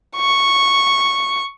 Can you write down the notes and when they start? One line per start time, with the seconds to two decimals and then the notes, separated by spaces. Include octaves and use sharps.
0.16 C#6